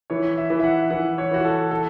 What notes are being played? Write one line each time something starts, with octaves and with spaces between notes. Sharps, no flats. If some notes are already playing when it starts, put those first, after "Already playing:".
E3 C#5
E5
E3
E5
F#5
E3 F#5
C#5
E3 F#4
A4
A4